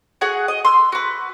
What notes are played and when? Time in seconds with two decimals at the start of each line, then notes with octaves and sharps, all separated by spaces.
0.21 F#4 G#4 D#5 F#5
0.48 D#5
0.65 C6 E6
0.92 F#4 B4